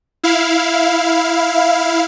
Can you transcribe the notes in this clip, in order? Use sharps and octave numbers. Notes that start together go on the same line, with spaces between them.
E4 F5